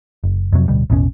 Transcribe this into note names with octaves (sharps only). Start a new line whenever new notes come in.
F#1
F2 C3 F#3
D1 B2 D3 G3
A1 E2 B2 C#4